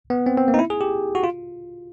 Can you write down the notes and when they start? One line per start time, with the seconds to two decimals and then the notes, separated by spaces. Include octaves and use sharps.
0.10 B3
0.26 C4
0.37 C4
0.48 A#3
0.54 D#4
0.59 E4
0.70 G#4
0.81 G4
1.15 F#4
1.24 F4